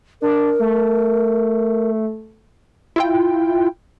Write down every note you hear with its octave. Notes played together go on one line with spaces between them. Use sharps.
D4 A#4
A3
E4 F4 G5